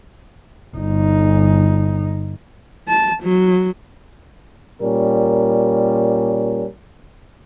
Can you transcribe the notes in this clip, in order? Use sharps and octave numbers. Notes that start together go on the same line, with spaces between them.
G1 D#4
A5
F#3
A#2 G3 C#4 A#4